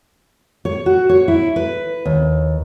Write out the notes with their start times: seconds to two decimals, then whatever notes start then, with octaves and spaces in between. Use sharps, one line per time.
0.65 C#5
0.86 F#4
1.09 C#5
1.28 E4
1.56 B4
2.05 D#2